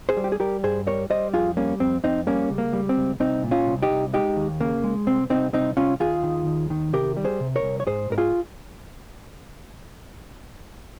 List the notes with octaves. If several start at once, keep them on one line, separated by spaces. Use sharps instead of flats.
G#4 C5
G3
G4
G#4
G3 G4 A#4
G2 G#4 C5
G3 A#4 C#5
G3 C5 D#5
F2 F4 G#4
G3 A#3 C#4
F2 C4
F2 C4 D#4
G3 A#3 C#4
C#2
A#3
G3
C4
C#2
C2 C4 D#4
A#2
C#4 F4
C2
D#4 G4
C2
G#3 D#4 G4
D#2
C#3 A#3
G#3
C2 C4
C2 C4 D#4
C2 C4 D#4
C2 C#4 F4
D#2 F4 G#4
D#3
D#2
D#3
C3 G4 A#4
G3
G#4 C5
C3
A#4 C#5
C2
C#5
G#2 G#4 C5
G#2 A#4
F4 G#4